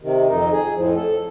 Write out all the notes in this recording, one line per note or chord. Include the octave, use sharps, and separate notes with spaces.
C3 D#3
F2 D#4
G#4
F2 A2 F3
A4